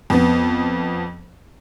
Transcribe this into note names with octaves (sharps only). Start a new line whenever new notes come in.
F2 B3